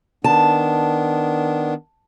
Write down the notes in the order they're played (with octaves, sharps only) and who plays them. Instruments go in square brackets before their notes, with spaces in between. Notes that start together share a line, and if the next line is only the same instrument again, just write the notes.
[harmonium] D#3 B3 D4 [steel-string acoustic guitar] A5